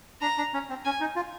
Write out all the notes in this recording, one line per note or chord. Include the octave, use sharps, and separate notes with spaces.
D4 A#5
D4
C#4
C4
C#4 G#5
D#4
F4